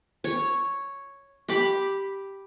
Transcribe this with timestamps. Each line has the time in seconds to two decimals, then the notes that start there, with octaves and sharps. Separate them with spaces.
0.24 C#5
1.48 G4 B5 D6